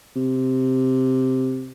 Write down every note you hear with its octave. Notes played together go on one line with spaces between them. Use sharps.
C3